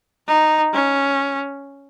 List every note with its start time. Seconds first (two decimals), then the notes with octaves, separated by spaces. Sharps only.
0.28 D#4
0.74 C#4